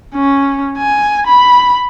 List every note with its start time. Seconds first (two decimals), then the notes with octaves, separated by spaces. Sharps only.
0.14 C#4
0.77 G#5
1.27 B5